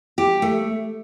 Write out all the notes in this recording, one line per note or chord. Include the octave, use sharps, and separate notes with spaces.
G4
A3